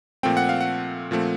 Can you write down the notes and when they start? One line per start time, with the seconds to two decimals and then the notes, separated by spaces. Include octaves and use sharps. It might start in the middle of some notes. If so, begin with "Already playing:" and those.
0.23 A#2 F3 A3 C4 G5
0.37 F#5
0.49 F5
0.60 F#5
1.11 A#2 F3 A3 C4